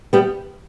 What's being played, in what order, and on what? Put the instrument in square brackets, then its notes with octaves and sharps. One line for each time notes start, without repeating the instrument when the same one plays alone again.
[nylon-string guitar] G3 B3